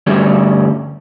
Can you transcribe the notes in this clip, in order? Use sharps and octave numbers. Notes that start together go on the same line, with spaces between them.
D2 G2 G3 C#4